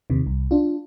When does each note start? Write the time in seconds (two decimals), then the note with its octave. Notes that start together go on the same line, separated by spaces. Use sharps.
0.10 D#2 C3 D#3
0.26 C2
0.51 D4 F4